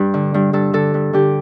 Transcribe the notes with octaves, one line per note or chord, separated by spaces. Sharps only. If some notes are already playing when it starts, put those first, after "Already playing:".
Already playing: G2 D4 G4
D3
G2
G2 A4
D3 A4
G2
D3 G4